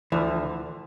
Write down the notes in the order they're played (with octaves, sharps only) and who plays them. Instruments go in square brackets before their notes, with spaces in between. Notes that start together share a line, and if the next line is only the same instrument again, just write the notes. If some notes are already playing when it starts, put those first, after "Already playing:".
[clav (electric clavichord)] D2 D3 F3 [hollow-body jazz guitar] E3